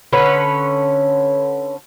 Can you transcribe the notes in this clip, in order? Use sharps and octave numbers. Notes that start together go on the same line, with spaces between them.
D3 C#4 B4 C#5